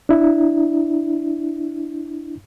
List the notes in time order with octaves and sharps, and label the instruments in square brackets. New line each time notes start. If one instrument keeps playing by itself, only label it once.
[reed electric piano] D4 E4